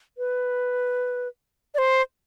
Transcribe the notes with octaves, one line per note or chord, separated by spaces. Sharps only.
B4
D5
C5